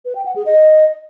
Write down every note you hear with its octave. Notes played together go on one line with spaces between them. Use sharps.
B4
G5
F#5
G#4
D#5